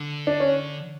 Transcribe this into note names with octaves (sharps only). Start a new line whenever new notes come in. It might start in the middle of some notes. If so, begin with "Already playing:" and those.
Already playing: D3
D4
C#4